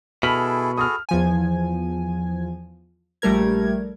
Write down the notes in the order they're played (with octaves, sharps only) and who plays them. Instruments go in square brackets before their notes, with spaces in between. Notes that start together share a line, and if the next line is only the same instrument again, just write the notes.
[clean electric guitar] B2 [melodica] E4 G#4 A4 [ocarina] B5 [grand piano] F6 B6 F#7
[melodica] F#4 G#4 A4 [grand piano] D#6 F6
[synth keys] E2 F3 G#5
A#1 G3 A3 A#4 G#6